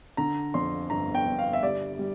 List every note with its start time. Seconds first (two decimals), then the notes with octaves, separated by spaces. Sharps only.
0.17 D3 A#5
0.54 F2 C6
0.90 G1 A#5
1.15 G5
1.27 G1
1.39 F5
1.53 E5
1.63 G3 D5
1.99 G3